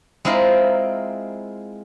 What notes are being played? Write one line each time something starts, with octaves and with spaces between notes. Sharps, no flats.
G#3 C4 E4 F4 A#4